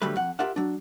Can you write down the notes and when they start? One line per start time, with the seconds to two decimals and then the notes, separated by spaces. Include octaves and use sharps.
0.02 D3 F#3 G3 A3 B4
0.16 F2 F#5
0.39 F4 G4 A#4 E5 F#5
0.56 F#3 D4